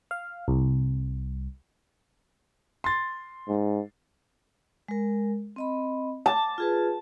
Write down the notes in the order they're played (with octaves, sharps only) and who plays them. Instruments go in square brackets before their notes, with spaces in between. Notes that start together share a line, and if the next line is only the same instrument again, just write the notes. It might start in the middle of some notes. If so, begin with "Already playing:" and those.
[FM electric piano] F5
C2
[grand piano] C6 A6
[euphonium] G#2
[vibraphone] G#3 A#4
C4 D#5 B5
[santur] A5 [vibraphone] D6
[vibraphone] F4 G#4 B4